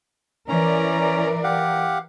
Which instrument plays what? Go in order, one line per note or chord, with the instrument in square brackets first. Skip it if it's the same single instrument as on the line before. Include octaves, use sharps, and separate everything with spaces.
[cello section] E3 A#4 D5 [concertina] C#4 A#5
[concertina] G4 F5 F#5